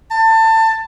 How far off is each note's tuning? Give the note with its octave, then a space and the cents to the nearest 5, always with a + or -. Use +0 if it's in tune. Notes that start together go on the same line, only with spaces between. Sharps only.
A5 +25